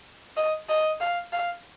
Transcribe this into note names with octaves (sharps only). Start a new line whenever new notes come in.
D#5
D#5
F5
F5